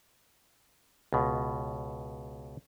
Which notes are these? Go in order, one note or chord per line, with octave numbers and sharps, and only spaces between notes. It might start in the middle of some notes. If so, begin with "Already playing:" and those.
C#2 B2